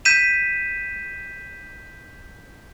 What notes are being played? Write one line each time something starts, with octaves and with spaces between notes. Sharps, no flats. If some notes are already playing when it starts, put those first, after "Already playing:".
G6 B6 D#7 E7